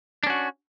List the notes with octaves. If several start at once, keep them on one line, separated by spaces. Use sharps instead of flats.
C#4 D4 F#4